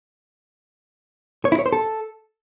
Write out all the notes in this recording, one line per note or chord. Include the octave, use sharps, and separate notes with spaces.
C#5
E4
C#5
C5
A4